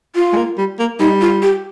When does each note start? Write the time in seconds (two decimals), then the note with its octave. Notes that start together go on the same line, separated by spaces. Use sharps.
0.15 F4
0.33 G#3
0.36 A#3
0.58 G3
0.79 A#3
1.00 G3 D#4
1.21 F4
1.42 G4